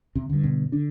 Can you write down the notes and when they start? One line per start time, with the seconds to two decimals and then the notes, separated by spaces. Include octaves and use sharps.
0.15 C3 C4
0.29 G2 D3
0.43 B2 B3
0.72 D3 D4